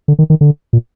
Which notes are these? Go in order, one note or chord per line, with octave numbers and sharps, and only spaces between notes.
D3
D#3
D#3
D3
A#2